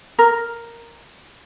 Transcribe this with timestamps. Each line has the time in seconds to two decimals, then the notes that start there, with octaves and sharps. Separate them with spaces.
0.19 A#4